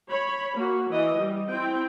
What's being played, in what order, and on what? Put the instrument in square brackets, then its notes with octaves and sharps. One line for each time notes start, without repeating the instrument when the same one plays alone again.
[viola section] C#5 B5
A#3 F#4
E3 D#5
G3
C4 E4 G5